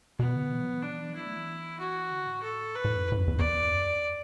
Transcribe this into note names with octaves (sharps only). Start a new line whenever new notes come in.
B2 B3
D3
E3
F#3
E3
F#3 D4
E3
F#3 E4
A3
E3
F#4
D3
A2
A4
B4
A2
F#2
E2
A2
F#2
E2
E2 D5
F#2